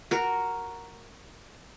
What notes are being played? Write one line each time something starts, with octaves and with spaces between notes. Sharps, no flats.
F#4 A#4